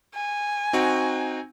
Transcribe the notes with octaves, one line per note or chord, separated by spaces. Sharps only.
G#5
C4 D#4 F#4